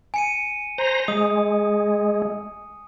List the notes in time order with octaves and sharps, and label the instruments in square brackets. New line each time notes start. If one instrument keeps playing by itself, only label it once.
[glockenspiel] G#5 C#7 D#7
[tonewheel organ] C5 A#5
[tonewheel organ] G#3 [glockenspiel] D#6